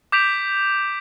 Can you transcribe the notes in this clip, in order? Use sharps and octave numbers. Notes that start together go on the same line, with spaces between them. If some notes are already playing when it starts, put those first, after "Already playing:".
D6 G6 B6 D7 F7